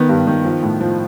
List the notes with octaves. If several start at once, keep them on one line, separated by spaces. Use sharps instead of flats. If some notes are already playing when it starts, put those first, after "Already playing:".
Already playing: D#3 B3
G2
D#3
F3
A2
F3